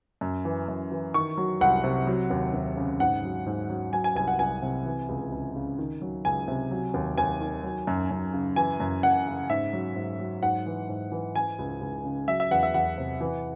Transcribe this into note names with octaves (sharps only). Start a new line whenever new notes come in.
F#2
E3
F#2
E3
D#3 C#6
F#3
C2 F#5
C3
F#3
D#2
D#2
C#3
G#2 F#5
F#3
G#2
F#3
F#3 G#5
G#5
C2 G#5
F#5
C2 G#5
C3
E3
C#2
C#2
C#3
D#3
F#3
C#2 G#5
C3
F#3
D#2
D#2 G#5
D#3
F#3
F#2
F#2
C#3
E3 G#5
F#2
F#2 F#5
C#3
G#2 E5
F#3
G#2
F#3
G#2 F#5
E3
G#2
E3
E3 G#5
C#2
C#2
C#3
F#3 E5
E5
E2 F#5
E5
E2 F#5
C3
E3